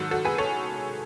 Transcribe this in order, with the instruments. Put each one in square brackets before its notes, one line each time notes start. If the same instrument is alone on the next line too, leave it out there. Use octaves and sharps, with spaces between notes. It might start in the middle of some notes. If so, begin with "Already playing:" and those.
Already playing: [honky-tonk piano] G#2 D#3 F#3 F#4 A4
F#4 A4
G#4 B4
A4 C#5